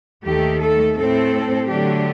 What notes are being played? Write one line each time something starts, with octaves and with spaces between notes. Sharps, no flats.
D#2 D#3 A3 G4
A4
A2 A3 C4 A4
D3 F#3 A3 D4 G4